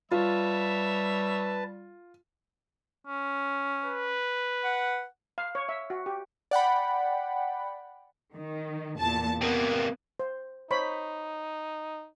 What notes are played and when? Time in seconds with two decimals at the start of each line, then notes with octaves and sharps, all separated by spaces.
0.11 G3 F4 B4 C#5 E5 A5
3.07 C#4
3.84 B4
4.64 F#5
5.38 F5
5.55 C#5
5.69 E5
5.90 F#4
6.06 G4
6.51 D5 F#5 G5 B5
8.35 D#3
8.98 E2 A#2 A5
9.41 C3 A#3 B3
10.19 C5
10.71 D#4 C5 C#5 B5